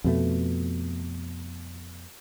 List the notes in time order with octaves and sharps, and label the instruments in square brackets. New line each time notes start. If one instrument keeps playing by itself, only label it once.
[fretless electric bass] F2 B2 A3